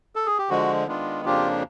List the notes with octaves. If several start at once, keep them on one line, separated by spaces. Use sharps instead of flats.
A4
G#4
G4
D3 F3 G#3 F#4
D#3 G#3 B3 D4 F4
F2 C#3 F3 A#3 D4 F4 G4